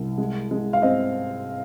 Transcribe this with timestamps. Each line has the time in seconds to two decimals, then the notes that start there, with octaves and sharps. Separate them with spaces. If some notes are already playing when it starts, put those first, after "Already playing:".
Already playing: C2
0.18 G#3
0.51 G#3
0.73 F5
0.82 C4 D#5